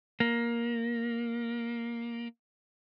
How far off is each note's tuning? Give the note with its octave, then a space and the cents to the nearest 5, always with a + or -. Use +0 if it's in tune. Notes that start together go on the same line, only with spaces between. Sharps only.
A#3 +10